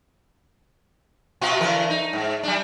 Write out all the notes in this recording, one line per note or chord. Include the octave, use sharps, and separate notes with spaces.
B2 F4 F#4
D3 E3 A#4
D#4
G#2
G3 D4